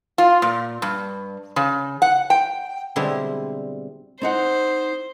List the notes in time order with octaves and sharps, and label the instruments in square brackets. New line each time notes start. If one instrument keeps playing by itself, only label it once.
[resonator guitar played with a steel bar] F4
A#2
G2
C#3
F#5
G5
[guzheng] B2 D3 G3 G#3 C4 E4
[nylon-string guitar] C4 D#4 F#5 [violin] C5